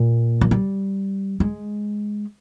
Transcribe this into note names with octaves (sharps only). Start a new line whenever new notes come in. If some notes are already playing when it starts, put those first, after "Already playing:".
Already playing: A#2
F3
G3
G#3